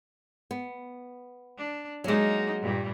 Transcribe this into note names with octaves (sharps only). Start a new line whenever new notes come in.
B3
D4
F#3 G#3 A#3 D#4
G2 A#2 G3